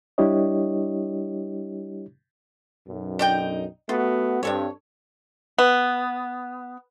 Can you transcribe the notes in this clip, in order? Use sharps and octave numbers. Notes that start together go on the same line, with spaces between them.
G3 D4 E4 G4 C#5 D#5
B1 F#2
D4 D#4 G5
A3 B3 F4 F#4
G2 C4 D4 A4 C#5
B3